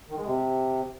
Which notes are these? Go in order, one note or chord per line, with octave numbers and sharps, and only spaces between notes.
D#3
G#3
C3